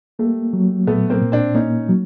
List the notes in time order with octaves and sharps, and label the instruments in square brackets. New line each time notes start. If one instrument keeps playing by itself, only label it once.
[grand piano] G3 A3 [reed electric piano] A#3
[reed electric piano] F#3
[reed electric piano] A#2 [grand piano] A3 B3
[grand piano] A#3 C4
[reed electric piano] A#2
[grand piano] C4 D4
[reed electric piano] A#3 [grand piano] C#4 D#4
[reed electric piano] F#3